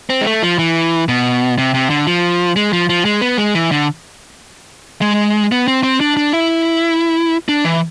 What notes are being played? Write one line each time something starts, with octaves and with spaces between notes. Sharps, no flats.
C4
G#3
A3
F3
E3
B2
C3
C3
D3
F3
G#3
F3
F3
G#3
B3
G#3
E3
D3
G#3
B3
C4
C4
D4
D4
E4
D4
E3